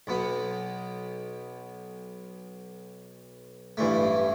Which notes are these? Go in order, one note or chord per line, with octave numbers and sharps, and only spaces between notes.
B1 B2 B3
A1 G2 E3 A3